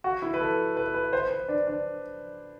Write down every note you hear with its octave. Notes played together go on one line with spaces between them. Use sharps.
F#4
E4
B4
A4
B4
B4
C5
B4
D4
D4